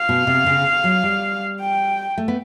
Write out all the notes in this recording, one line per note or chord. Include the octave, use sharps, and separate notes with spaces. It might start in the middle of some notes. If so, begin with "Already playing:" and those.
Already playing: F5
B2
C3
C#3
F#3
G3
G5
A3
B3